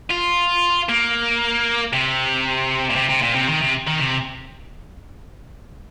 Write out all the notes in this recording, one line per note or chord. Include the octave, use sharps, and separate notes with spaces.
F4
A#3
C3
A#2
C3
C3
A#2
C3
D#3
C3
D#3
C3